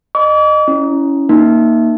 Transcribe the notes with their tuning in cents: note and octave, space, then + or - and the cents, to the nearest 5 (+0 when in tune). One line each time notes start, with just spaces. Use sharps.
D#5 -25 D6 -45
C#4 +15 E4 +0
A#3 +0 D#4 +0